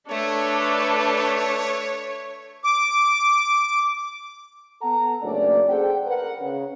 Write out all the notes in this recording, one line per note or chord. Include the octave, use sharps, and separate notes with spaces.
A3 D4 A4 B4 C#5
D6
B3 A4 F#5 A5 A#5
F#1 A#2 A3 C#4 D4 D5
G#4 A4 C5 F#5 G5
A#4 B4 F#5
C#3